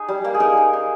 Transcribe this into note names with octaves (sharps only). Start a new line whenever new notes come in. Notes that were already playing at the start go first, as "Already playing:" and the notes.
Already playing: D#4 G#4
G3
A#3
G#4
D#4 A#4
A#3
D#4